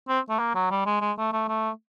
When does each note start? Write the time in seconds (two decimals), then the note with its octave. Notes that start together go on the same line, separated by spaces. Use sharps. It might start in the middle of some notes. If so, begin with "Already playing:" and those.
0.08 C4
0.29 A3
0.39 A#3
0.55 F#3
0.71 G3
0.86 G#3
1.01 G#3
1.18 A3
1.33 A3
1.48 A3